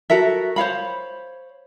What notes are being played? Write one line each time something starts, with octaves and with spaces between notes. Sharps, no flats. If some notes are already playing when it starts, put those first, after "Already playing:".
F#4 A4 A#4 E5
C5 C#5 F5 B5